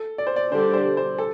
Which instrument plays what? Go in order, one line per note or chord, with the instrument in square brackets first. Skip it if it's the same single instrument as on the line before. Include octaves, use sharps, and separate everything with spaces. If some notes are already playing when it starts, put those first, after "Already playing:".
Already playing: [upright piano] A4
D5
C5
D5
[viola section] D3 G3 D4 G4 [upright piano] C5
[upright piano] C5
C5
A4